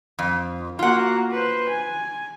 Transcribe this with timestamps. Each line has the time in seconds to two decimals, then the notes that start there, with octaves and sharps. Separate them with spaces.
0.19 F2
0.79 A#3 F4 F#4 F#5
1.31 B4 C5
1.69 G#5